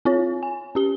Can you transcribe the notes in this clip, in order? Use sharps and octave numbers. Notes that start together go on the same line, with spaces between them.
C4 F4 C#5
G#5
C#4 G4 G7